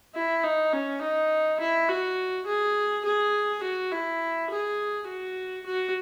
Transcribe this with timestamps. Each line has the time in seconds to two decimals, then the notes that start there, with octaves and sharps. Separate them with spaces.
0.15 E4
0.44 D#4
0.72 C#4
1.02 D#4
1.59 E4
1.89 F#4
2.47 G#4
3.05 G#4
3.63 F#4
3.91 E4
4.50 G#4
5.08 F#4
5.66 F#4